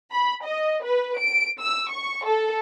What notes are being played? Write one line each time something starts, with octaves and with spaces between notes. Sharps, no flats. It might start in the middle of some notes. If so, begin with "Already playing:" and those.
B5
D#5
B4
D7
E6
C#6
A4